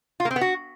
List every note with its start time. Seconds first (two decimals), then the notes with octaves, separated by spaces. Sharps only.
0.20 F4
0.25 A#3
0.31 C4
0.36 B3
0.41 F#4